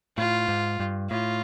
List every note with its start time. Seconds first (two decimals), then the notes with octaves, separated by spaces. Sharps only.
0.17 A2 F4
0.48 G#2
0.80 G2
1.10 A2 F4